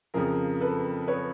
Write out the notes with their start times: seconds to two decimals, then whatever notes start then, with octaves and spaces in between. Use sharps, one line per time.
0.14 F2 C#3 F3 G#4 A#4
0.60 A4 B4
1.07 B4 C#5